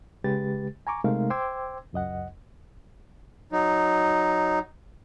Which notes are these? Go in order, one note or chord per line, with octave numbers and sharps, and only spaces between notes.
C#3 G#3 G4 B4 A6
G#5 A#5 C#6 D6
C3 G#3 A3 D#4 A#4 F5
C5 G5 C6 D6 E6 G#6
C#2 F#2 D#5 F#5
F#3 D#4